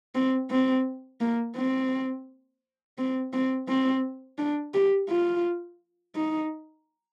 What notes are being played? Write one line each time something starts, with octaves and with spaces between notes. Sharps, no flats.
C4
C4
A#3
C4
C4
C4
C4
D4
G4
F4
D#4